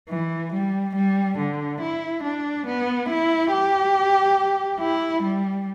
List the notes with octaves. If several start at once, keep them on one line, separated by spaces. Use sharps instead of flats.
E3
G3
G3
D3
E4
D4
B3
E4
G4
E4
G3